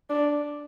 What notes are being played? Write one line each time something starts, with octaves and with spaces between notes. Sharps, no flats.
D4